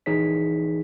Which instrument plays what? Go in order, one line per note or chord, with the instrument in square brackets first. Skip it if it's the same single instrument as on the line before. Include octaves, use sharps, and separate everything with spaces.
[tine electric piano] A#1 E3 D#4 G#4 C#5 B6